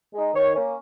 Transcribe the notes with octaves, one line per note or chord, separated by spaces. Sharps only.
G#3 D#4
D#3 C#5
A#3 C#4